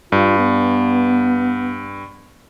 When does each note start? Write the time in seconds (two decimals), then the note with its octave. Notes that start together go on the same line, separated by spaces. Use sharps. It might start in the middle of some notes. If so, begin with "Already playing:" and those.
0.12 G2 F4
0.38 B3